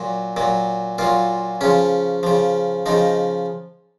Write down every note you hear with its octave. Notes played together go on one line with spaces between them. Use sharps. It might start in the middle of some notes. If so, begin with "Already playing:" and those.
Already playing: A#2 F#3
A#2 F#3
A#2 F#3 F4
C#3 F3 C#4
C#3 F3
C#3 F3 D#4